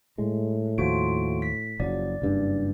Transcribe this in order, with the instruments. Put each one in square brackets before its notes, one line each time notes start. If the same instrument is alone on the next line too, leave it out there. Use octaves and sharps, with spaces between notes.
[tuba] A2 [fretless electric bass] G#3
[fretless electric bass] D#2 F3 [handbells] F4 F#4 D7
[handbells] B6
[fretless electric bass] F#1 F3 F#3 [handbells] D5
[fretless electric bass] F#1 G2